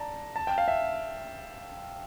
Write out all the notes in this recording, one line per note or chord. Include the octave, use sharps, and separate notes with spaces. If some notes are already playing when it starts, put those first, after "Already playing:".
Already playing: D5 A5 A#5
A5
G5
F5
E5